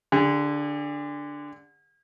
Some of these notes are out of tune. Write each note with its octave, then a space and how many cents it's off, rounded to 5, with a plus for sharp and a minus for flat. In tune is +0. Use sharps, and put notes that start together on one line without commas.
D3 +0 G#4 -45